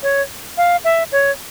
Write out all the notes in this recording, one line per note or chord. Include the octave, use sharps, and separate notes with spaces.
C#5
F5
E5
C#5